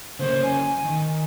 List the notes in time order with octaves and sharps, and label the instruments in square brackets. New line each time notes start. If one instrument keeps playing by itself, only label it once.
[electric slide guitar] C#3 A#3 C#4 [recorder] C5
[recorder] G#5
[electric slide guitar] D#3